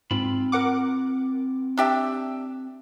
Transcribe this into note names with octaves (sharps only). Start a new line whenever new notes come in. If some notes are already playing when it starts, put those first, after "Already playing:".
G#2 C4 F4 B5
A#4 F#5 D6
D4 G4 E5